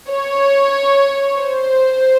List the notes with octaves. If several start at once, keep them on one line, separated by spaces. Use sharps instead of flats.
C#5
C5